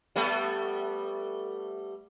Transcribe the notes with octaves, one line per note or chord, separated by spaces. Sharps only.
G3 A3 B3